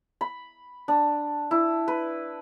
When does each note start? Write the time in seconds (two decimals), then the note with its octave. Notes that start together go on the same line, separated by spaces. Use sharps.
0.21 B5
0.88 D4
1.51 E4
1.88 B4